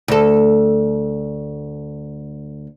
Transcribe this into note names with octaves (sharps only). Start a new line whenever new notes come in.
D2 A4